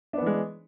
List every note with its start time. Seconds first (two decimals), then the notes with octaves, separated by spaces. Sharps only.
0.13 D4
0.18 B3
0.22 E3
0.26 G#3